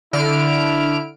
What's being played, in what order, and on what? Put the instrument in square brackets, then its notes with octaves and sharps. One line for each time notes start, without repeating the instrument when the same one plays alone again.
[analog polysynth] D3 F6 D7 [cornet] E4